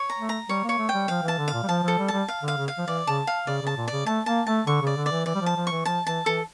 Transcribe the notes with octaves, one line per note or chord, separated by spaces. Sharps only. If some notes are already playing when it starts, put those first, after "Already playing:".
Already playing: C#5
A#5
A3
A#5
G3 C#5
A#3 C#5
A3
G5
G3
F3 F5
E3
A5
D3
F5
A#2
G3
F3 A5
F3 A4
G3
G3 A5
F5
D3 F5
C#3
F5
F3
E3 D5
C#3 A5
F5
C#3 D5
C#3 A5
A#2
C#3 D5
A3 A5
A#3 A5
A3 A5
D3 C#6
C#3 D5
D3
D5
E3
E3 D5
G3
F3
A5
F3
E3 C#6
F3 A5
E3 A5
E3 A4